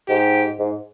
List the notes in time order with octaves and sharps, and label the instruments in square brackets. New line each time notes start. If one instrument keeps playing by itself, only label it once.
[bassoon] G#2 [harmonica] G4
[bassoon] G#2